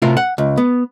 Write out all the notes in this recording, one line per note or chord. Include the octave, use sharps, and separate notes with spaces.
A2 C3 F4 A#4 F5
F#5
C#2
B3